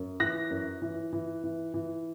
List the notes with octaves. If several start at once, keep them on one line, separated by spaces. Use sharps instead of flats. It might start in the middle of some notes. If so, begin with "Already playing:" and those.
Already playing: F#2
E3 F#6 A#6
F#2
E3
E3
E3
E3